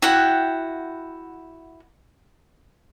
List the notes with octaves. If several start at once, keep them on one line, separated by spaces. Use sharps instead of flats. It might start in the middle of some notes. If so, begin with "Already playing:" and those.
E4 F#4 F#5 G5